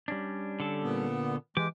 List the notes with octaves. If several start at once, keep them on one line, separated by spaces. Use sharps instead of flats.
G3 C#4 D4
D3 A4
A#2 B3
E3 G#3 G4 D6